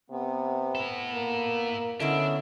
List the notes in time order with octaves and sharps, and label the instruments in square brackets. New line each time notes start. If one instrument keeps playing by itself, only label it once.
[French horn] C3 [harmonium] B3
[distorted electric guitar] E4 A4
[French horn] A#3
[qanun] D3 E4 D#5 [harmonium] B3 C#4 E5 [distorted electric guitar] D4